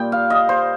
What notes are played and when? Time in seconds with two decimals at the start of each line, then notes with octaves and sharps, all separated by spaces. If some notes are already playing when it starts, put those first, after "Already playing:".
Already playing: A#2 G3 G5
0.12 F5
0.30 D#5
0.49 C5